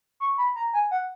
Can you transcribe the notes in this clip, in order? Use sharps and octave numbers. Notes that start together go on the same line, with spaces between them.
C#6
B5
A#5
G#5
F#5